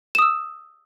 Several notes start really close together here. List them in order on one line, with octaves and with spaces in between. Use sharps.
E7 D#6 E6